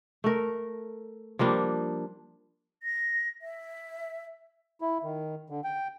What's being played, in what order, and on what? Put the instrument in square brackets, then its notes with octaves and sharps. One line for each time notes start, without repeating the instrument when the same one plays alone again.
[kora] A3 A#4
F3 G3 A#3 D4
[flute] A#6
E5
[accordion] E4
D#3
D3
G5